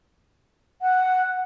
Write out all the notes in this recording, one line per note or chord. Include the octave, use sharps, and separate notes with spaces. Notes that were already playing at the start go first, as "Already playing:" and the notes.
F#5